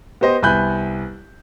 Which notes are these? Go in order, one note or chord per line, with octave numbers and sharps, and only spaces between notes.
B3 G4 C5 D#5
C2 B3 G#5 B5 F#6 G6